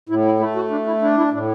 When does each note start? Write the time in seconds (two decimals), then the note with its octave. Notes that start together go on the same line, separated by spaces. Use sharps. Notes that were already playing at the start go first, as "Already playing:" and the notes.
0.09 A2 E4
0.25 E4
0.39 A3 E4
0.56 F#4
0.70 D4
0.87 E4
1.02 D4 E4
1.17 E4
1.33 A2 D4